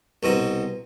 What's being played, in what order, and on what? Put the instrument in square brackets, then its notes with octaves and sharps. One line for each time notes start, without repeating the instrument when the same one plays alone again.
[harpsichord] C2 B2 C4 A#5